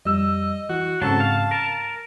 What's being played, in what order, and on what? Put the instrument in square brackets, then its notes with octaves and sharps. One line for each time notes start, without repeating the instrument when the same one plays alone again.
[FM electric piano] F2 G3 E6 [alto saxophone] D#5
[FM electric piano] E3 [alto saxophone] F#4
[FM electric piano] G#2 C#3 C4 [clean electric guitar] F#3 F#4 A4 [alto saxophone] A5
[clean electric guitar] F5
[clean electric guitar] A#4 [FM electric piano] F6